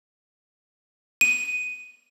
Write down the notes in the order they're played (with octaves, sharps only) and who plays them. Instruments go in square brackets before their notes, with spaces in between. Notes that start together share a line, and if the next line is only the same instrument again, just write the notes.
[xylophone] D#7